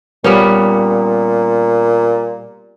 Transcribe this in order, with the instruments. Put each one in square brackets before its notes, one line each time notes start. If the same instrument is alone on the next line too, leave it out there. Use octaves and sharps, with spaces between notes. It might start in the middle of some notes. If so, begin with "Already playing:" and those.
[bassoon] A#2 [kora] G3 B3 C#4